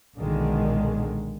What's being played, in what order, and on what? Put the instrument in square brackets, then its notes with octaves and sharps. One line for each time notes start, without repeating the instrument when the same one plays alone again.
[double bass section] B1 A#2 D3 D#3 G#3